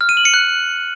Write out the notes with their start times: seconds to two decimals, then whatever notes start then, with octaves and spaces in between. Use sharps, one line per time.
0.01 F6
0.09 D#7
0.17 F#7
0.25 C#7
0.34 F#6